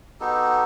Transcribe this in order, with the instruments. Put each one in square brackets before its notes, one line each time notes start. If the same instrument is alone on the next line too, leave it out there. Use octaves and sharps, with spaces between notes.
[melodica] B3 D#4 F#4 G4 A4